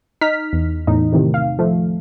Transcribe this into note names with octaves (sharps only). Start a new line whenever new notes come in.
D#4 F6 B6
E2
E2 A2 D#4
A2 C3 D#3
F5
F3 A3